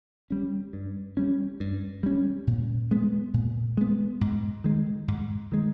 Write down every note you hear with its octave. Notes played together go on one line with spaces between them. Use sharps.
G3 C#4
G2
G3 C#4
G2
G3 C#4
A#2
G#3 B3
A#2
G#3 B3
G#2
D#3 G#3
G#2
D#3 G#3